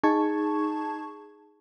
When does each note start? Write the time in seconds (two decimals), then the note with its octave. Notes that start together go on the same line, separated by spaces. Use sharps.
0.04 D#4 G#4 A5 C#6 G#6